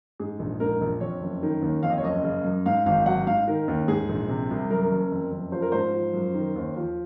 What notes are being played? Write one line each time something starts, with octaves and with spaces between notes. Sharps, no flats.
G#2 G#4
A#1
G#2 A#4
A#1
F2 C#5
F#1
D#3
D#2
F2 F5
D#5
C#5
F#1 D#5
C#3
F#2
G#2 F5
G#1 F5
F#3 F#5
G#2 F5
D#3 A#4
D#2
G#2 G#4
A#1
C3
C2
F#2 A#4
F#1
F2
F#1
F3 C5
A#4
G#2 C5
F3
F#2
D#3
D#2
F3